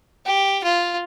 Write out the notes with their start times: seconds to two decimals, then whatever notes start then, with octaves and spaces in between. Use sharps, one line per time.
0.26 G4
0.63 F4